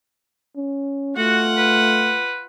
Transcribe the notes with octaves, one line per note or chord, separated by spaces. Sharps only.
C#4
A3 F4 F#4 F#5
B4